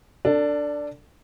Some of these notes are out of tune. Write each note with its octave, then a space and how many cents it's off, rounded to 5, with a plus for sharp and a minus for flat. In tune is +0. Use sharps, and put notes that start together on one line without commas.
D4 +0 A4 +30